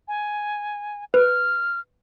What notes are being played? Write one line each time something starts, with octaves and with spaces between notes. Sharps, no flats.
G#5
B4 F6